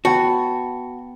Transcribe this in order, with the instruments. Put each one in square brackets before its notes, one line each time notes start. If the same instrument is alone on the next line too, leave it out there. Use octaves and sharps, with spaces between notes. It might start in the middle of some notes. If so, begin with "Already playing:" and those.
[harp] B3 G5 A5 [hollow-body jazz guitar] F#4